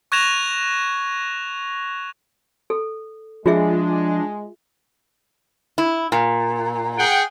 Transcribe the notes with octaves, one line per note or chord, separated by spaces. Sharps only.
C#6 F#6 G#6 A#6 E7 F7
A4
F3 G#3 D4 F4 G#4 E5
E4
A#2
G#4 F#5 G5